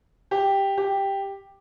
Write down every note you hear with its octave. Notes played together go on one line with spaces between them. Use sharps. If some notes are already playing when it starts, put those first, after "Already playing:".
G4
G4